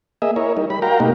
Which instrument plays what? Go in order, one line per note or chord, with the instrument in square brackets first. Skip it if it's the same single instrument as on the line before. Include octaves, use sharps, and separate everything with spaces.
[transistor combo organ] A#3 G#4 D#5 E5
E4 A#4 C#5
G3 D#4
G3 B5
F#4 A#4 F5 G5 A#5
B2 A3 A#3 D#4 F#4 G4